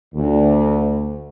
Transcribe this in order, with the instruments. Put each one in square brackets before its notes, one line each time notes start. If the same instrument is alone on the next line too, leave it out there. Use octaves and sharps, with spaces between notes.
[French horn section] D2